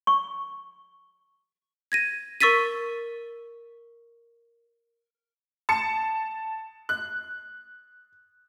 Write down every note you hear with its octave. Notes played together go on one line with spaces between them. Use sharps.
C#6
G#6 A#6 D#7
A#4 C#6 E6 A6 B6 D#7
A5 C#7
F#6